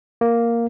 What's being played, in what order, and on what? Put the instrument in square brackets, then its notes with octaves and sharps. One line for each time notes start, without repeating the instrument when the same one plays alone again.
[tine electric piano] A#3